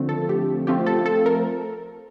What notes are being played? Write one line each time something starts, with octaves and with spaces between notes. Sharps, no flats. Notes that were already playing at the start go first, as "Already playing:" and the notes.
Already playing: D3 F3 A3 C4
A4
G4
F3 A3 C4 F4 G4
A4
A4
A#4